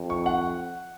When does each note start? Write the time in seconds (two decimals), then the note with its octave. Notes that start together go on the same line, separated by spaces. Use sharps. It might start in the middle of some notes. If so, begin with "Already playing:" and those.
Already playing: F2
0.10 C#6
0.26 F#5